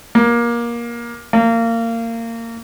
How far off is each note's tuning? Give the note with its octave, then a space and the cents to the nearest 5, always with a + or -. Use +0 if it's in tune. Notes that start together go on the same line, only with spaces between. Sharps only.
A#3 +20
A#3 -25